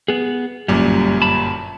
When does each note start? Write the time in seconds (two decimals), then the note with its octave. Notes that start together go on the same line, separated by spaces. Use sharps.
0.08 B3 G#4
0.68 G1 F#2 A#2 G3
1.22 A5 B5